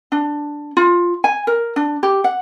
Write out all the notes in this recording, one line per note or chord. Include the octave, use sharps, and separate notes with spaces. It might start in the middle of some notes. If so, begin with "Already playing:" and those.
D4
F4
G#5
A#4
D4
G4
F#5